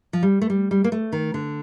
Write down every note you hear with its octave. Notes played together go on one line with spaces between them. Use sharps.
F3
G3
A3
G3
G3
A#3
A3
D#3
D3